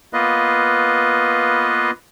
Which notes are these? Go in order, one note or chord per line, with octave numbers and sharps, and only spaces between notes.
A#3 B3 F4 B4 D#5